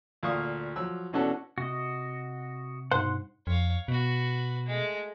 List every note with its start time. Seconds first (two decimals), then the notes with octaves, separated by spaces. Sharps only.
0.23 D2 A#2 F5 C#6 D#6 F6
0.76 F3 F#3 E6
1.13 B2 E3 C#4 D4 F#4 A4
1.58 C3 F#4 D#5
2.91 G2 B2 D#4 C5 F#5 C6
3.47 F2 C#5 F5
3.88 B2 F#4 B4
4.66 G#3 A3